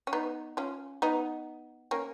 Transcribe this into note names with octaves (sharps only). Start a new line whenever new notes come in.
C#4
B3 D#4
C#4 F4
B3 D#4
A#3 C#4